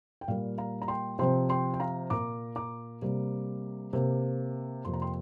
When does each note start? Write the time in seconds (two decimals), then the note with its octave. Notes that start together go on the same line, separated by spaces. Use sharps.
0.21 G5
0.28 A#2 G3 A#3 F5
0.58 F5 A#5
0.82 A#5
0.88 G5 C6
1.19 C3 F3 C4 G5 C6
1.49 G5 C6
1.74 G5
1.80 F5 A#5
2.10 A#2 A#3 A#5 D6
2.56 A#5 D6
3.02 C3 G3 A#3
3.93 C3 A#3
4.85 F2 C3 A#3 C6
4.94 A#5
5.02 G5 C6